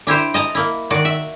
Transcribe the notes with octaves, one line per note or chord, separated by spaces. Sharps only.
D4 E4 G4 C5
D#5 A5 A#5
A#3 E4
D#3 F#4 D5
E5